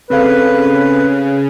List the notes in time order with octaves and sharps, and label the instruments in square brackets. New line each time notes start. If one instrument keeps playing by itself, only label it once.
[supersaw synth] C#3 [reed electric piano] C4 A4 F5 [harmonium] B4